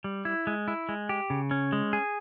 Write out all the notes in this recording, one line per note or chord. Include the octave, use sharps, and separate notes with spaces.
G3
E4
G#3
E4
G#3
G4
C#3
C#4
G#3
G#4